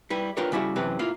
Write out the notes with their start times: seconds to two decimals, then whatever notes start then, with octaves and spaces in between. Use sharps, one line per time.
0.10 G3 E4 B4
0.37 D4 F4 G4 A#4 B4 C#5
0.52 C#3 G3 E4 F#4
0.76 F#2 C3 E3 C4 B4
0.99 A#3 E4 F4 F5